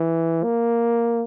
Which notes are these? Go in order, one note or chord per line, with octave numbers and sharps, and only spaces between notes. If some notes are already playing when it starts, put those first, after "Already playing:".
Already playing: E3
A#3